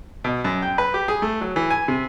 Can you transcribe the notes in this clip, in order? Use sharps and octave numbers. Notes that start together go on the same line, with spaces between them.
B2
F#2
G5
B4
G4
G#4
A3
F#3
E3
G#5
C3